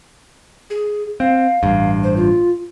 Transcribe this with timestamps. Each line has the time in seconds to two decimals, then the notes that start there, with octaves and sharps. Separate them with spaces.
0.70 G#4
1.20 C4 F5
1.63 A1 G2
2.03 C5
2.17 F4